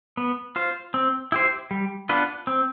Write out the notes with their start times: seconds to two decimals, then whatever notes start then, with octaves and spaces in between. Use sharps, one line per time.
0.17 B3
0.56 F4 C5
0.94 C4
1.32 E4 G4 C5
1.71 G3
2.09 B3 D4 F4 B4
2.47 C4